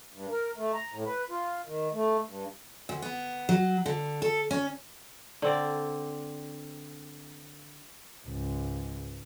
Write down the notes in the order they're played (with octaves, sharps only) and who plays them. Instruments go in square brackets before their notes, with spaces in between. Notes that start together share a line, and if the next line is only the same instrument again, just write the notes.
[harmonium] G2
A#4
A3
A#5
A2
B4
F4
D#3
A3
G2
[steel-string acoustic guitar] D2
B3
F#3
D3
A4
C#4
[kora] D3 C4 D5
[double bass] C#2 G#2